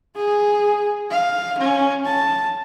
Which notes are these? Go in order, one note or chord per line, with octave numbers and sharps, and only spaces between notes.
G#4
F5
C#4
A5